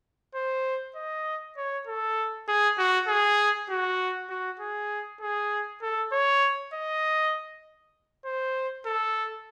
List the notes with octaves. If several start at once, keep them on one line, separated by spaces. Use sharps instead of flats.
C5
D#5
C#5
A4
G#4
F#4
G#4
F#4
F#4
G#4
G#4
A4
C#5
D#5
C5
A4